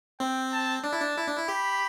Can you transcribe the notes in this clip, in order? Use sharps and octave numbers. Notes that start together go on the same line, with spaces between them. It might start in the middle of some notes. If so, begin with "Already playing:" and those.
C4 G5
A5
D4 A5
E4
D4
E4
D4
E4
G4 B5